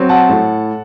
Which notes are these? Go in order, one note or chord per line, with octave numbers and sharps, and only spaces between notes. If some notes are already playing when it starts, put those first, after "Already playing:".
Already playing: F#3 C4
F#5 A5
A2